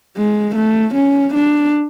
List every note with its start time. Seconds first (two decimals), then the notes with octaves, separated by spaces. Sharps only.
0.17 G#3
0.56 A3
0.95 C#4
1.34 D4